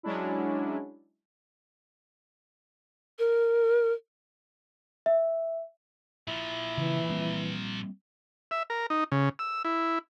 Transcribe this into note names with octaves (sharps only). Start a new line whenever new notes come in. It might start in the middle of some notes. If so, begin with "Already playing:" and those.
F#3 G#3 C#4 D4 E4
A#4
E5
A#2 F3 E4
C#3 E3
G3 A#3 C4
E5
A#4
D#4
C#3
E6
E4